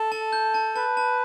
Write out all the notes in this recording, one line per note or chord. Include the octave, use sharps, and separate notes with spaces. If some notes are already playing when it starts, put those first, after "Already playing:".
Already playing: A4
A5
G6
A5
B4 A5
A5